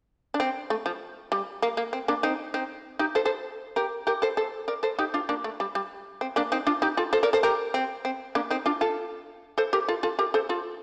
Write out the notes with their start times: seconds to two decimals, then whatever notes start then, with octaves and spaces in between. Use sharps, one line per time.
0.34 D4
0.40 C4
0.70 A3
0.86 F3
1.32 G3
1.62 A#3
1.77 A#3
1.93 C4
2.08 A#3 D4
2.23 C4 D#4
2.54 C4 D#4
2.99 D#4 G4
3.15 A4 C5
3.25 A4 C5
3.76 G4 A#4
4.07 G4 A#4
4.22 A4 C5
4.37 A4 C5
4.68 A#4 D5
4.83 A4 C5
4.99 D#4 G4
5.14 D4 F4
5.29 A#3 D4
5.44 A3
5.60 G3
5.75 G3
6.21 C4
6.36 A#3 D4
6.52 C4 D#4
6.67 D4 F4
6.82 D#4 G4
6.97 F4 A4
7.13 A4 C5
7.23 A#4 D5
7.33 A4 C5
7.43 G4 A#4
7.74 C4
8.05 C4
8.35 A#3 D4
8.50 C4 D#4
8.66 D4 F4
8.81 F4 A4
9.58 A4 C5
9.73 G4 A#4
9.88 F4 A4
10.03 F4 A4
10.19 G4 A#4
10.34 A4 C5
10.49 F4 A4